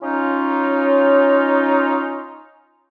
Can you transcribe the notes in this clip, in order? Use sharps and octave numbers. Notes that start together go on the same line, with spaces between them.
C#4 D#4 F4